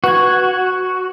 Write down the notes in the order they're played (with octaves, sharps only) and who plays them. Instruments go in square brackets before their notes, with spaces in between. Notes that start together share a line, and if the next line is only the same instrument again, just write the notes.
[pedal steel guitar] F#4 [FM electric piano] B4 F#6 G#6